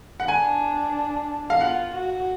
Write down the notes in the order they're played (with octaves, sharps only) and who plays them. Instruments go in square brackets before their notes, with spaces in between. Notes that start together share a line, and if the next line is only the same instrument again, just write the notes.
[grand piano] F#5
[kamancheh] D4 [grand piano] G#5
[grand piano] F5
[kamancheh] F4 [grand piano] F#5
[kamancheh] F#4